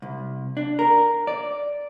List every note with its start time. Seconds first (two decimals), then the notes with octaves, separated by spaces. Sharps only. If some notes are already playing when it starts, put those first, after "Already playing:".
0.02 C2
0.57 D4
0.79 A#4
1.27 D5